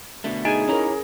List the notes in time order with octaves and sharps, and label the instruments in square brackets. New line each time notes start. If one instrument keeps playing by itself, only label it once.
[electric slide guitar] B2 D3 A3
[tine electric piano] D#4 [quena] G#4 [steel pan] G#5
[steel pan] C#4 A#4 [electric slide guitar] E4 C#5 A#5